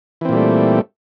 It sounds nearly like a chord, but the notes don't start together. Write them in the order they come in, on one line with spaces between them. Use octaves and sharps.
E3 C4 A#2 G3 A3